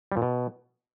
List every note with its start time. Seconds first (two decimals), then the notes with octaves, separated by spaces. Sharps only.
0.12 G3
0.17 A#2
0.22 B2